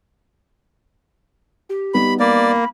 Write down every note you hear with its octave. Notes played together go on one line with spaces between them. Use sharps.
G4
G3 B3 D#4 B5
A#3 D5 B5